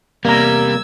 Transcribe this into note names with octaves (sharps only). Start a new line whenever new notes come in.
E2 C3 G3 A#3 A#4 E6 G#6